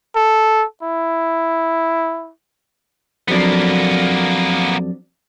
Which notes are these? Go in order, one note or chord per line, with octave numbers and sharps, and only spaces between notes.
A4
E4
F2 F#3 A#3 B3 D4